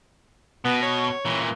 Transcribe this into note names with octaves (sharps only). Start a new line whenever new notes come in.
B2 B3
C#5
A#2 E3